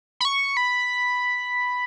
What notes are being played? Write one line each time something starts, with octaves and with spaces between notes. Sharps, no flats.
B5
C#6
B5